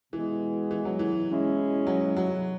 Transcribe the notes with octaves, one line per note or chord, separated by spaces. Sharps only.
B2 E3 G#3 B3
E3
F#3
E3
B2 G#3 C#4 E4
F#3
F#3